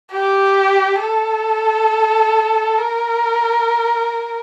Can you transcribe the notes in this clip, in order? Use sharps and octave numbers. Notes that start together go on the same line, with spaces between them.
G4
A4
A#4